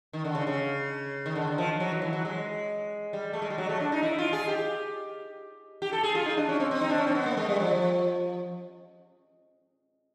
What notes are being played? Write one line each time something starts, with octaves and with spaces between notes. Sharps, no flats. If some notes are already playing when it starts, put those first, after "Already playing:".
D#3
D3
C#3
C#3
D#3
D3
D#3
F3
F#3
E3
E3
F#3
G#3
G3
A3
G#3
G3
F#3
A3
D4
D#4
E4
F4
G#4
G4
G4
A4
G#4
F4
D#4
D4
C#4
C4
C4
D#4
D4
C#4
C4
B3
A#3
G#3
G3
F3